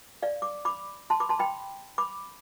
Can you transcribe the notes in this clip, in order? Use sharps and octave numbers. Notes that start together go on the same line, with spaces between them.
D5 F5
D6
B5 D6
A5 C6
B5 D6
A5 C6
G5 B5
B5 D6